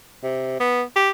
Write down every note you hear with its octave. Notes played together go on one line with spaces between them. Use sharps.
C3
B3
G4